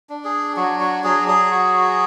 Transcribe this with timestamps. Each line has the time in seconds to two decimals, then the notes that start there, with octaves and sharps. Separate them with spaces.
0.09 D4
0.24 G#4
0.56 F#3 F#4
0.80 F#4
1.04 F#3 G#4
1.28 G#4
1.51 F#4